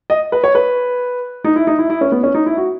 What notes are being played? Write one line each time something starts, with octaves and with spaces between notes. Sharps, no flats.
D#5
B4
C#5
B4
D#4
E4
D#4
E4
E4
C#4
B3
C#4
D#4
E4
F#4